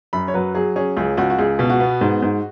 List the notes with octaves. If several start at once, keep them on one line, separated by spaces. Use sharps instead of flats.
F#2 B5
C#5
F#3 B4
F#3 G#4
C#4 G#4
C#2 G#4
C#2 F#4
F#4
C#2 G#4
B2
F#4
B3
G#2
G#2